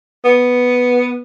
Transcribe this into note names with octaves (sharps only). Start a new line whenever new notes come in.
B3